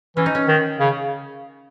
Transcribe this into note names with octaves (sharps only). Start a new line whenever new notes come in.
E3 C#4
D#4
C#4
D#3
C#3